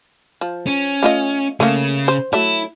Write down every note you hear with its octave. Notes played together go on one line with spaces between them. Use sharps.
F3
C#4
A3 F4 D#5
C#3 A3 A#3
C5
F#3 A3 E4